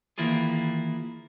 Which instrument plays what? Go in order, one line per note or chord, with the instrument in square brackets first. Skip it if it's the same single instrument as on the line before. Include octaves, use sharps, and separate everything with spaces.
[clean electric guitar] D#3 E3 A#3 E4 F4 G#4